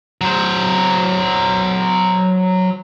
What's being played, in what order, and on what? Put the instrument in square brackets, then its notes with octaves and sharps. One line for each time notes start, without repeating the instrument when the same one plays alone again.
[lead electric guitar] F#3 C5